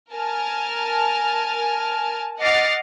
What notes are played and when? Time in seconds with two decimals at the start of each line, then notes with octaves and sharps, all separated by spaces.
0.14 A#4 G#5 A5 F6
2.39 D#5 F#5 D6 F6 A6 C7